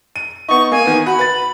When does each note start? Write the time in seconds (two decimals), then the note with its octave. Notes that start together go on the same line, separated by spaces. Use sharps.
0.16 D#7
0.48 B3 D#4 C#6
0.72 A#3 G#5
0.86 D#3 B3
1.06 F#4 B5
1.19 B4 A6